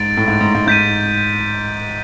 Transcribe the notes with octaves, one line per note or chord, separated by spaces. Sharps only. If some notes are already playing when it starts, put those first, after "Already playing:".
Already playing: G#2 A6 D7
A2
G#2
G#2
G#2
G#2 G6 B6 D#7